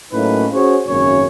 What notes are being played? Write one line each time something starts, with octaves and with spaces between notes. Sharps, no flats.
A2 F#3 A#3 C#4 D#4 B4
C#4 F#4 G#4 C5 C#5
G#1 F#2 C#3 A#3 C#4 C#5